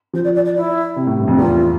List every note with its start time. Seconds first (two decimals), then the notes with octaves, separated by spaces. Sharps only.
0.13 F3 C5
0.24 D5
0.35 D5
0.45 D5
0.56 E4
0.96 C3
1.07 A2
1.18 G2
1.28 F2
1.38 E2 F4